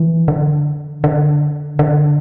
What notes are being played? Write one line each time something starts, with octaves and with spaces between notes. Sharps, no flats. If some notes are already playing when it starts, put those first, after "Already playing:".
Already playing: E3
D3
D3
D3